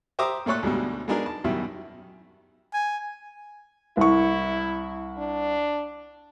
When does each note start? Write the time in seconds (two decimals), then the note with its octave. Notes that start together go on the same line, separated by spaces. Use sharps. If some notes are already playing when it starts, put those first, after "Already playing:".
0.19 G4 C5 E5 A#5 D6 D#6
0.46 A#2 A3 A4 C#5 F#6
0.63 D2 G#2 B2 G3
1.08 G#3 B3 D4 D#4 G#4 A#4
1.26 A5
1.44 F#2 B2 D#3 G3 E4
2.74 G#5
3.97 C2 E4 C#6
5.18 D4